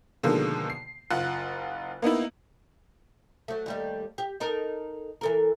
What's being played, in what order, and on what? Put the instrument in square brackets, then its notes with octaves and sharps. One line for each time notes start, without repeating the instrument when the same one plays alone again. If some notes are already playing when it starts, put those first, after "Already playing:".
[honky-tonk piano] B2 D3 D#3 F3 G#3 A#3
C7
F#1 F4 F#5 F#6
A#3 B3 D#4 E4
[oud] F#3 A3
D#2 G3 A3
G4
D#4 A4 A#4
E3 A4 A#4